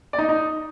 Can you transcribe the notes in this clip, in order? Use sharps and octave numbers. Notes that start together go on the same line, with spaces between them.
D5
D#4
D#5
D#4